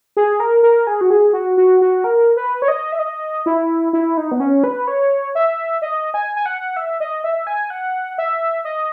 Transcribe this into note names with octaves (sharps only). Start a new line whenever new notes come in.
G#4
A#4
A#4
G#4
F#4
G#4
F#4
F#4
F#4
A#4
B4
C#5
D#5
E5
D#5
E4
E4
D#4
B3
C#4
B4
C#5
E5
D#5
G#5
G#5
F#5
E5
D#5
E5
G#5
F#5
E5
D#5